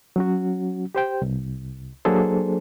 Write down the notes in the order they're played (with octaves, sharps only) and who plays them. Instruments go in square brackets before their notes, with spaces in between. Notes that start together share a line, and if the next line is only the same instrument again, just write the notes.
[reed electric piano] F#3 C#4 F#4
G4 C5 G5
C2
F#3 A#3 D4 G#4 A4 C5